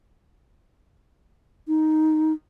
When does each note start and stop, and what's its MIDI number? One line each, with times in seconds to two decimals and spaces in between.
1.68 2.33 63